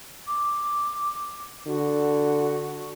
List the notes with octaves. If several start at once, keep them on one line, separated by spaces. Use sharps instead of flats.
D6
D3 F#4